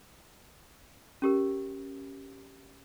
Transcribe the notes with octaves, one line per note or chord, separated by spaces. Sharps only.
C#4 G4 A#4